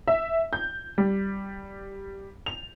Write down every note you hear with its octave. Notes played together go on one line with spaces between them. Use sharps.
E5
G6
G3
F7